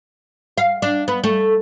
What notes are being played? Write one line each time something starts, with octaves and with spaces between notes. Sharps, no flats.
F5
D4
B3
A3